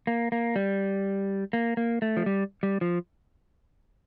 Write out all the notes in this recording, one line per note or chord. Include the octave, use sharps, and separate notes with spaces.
A#3
A#3
G3
A#3
A#3
A3
F3
G3
G3
F3